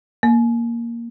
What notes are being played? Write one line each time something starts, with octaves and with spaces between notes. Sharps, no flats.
A#3